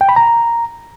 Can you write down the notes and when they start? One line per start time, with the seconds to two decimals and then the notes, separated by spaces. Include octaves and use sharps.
0.01 G5
0.09 B5
0.16 A#5